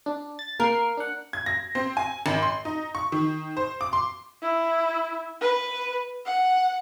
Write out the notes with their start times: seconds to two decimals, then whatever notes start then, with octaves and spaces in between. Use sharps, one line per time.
0.06 D4
0.39 A6
0.60 A#3 A#4 C7
0.97 D4 F#5
1.33 G#6
1.46 A#6
1.75 C4
1.97 G#5
2.26 G#1
2.42 C6
2.65 D#4
2.95 C#6
3.12 D#3
3.57 C5
3.81 D6
3.93 C6
4.43 E4
5.41 B4
6.26 F#5